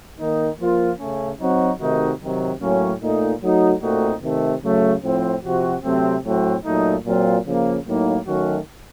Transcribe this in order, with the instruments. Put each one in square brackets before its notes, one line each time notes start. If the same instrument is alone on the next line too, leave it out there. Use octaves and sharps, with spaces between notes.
[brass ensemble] D#3 A#3 D#4
F3 A#3 F4
C#3 A3 C#4
F#3 C4 D#4 F#4
C3 D#3 A3 D#4 F#4
C3 D#3 F#3
A2 F#3 A#3 C#4
A#2 A3 D#4
F#3 A3 D#4 F#4
A#2 A3 C4 D#4 F#4
C3 D#3 A3
C#3 F#3 A3
A2 F3 C4
C3 F3 C4 F#4
C3 F#3 A3 C4
A2 F#3 A3 C4 F#4
A#2 F#3 A3 D#4
A#2 F#3 C4 F4
C#3 F3 A#3
A2 F#3 A#3 D#4
D#3 F#3 A3 C#4 F#4